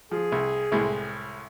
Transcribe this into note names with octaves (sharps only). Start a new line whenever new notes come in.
F3 G#4
C2
C2 A2 G#3